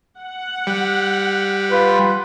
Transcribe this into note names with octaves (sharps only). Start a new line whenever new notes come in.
F#5
G3
F4 B4